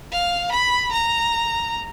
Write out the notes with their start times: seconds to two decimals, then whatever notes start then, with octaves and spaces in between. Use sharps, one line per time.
0.11 F5
0.51 B5
0.91 A#5